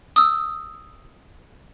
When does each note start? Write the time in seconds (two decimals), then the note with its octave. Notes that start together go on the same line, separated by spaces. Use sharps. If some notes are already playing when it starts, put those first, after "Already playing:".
0.16 D#6 E6